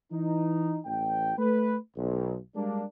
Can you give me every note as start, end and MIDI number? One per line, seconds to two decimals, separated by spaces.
0.11 0.79 52
0.11 0.79 63
0.85 1.33 33
0.85 1.33 79
1.38 1.76 57
1.38 1.76 71
1.96 2.37 35
2.55 2.83 55
2.55 2.83 56
2.55 2.83 58
2.55 2.83 62